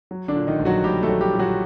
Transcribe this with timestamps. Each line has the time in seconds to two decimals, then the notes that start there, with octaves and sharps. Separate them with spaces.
0.11 F#3
0.28 D3 D4
0.35 A#2
0.47 D#3 D#4
0.59 A#1
0.65 F#3 F#4
0.84 A#1 G3 G4
1.03 A3 A4
1.09 F#3
1.21 G3 G4
1.34 A#2
1.39 F#3 F#4